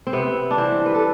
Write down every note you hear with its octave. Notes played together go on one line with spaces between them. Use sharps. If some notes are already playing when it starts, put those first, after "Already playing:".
C4
C3 B3
D4
E3 G3 C4
B4
A4